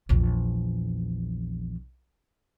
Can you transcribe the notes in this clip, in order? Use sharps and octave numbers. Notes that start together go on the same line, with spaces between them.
A#1 E2